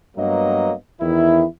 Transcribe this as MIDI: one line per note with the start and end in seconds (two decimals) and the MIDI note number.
0.17 0.73 43
0.17 0.73 54
0.17 0.73 58
0.17 0.73 59
0.17 0.73 75
1.01 1.44 40
1.01 1.44 51
1.01 1.44 64